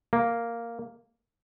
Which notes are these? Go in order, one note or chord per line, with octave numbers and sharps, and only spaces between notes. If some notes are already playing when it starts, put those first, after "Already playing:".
A#3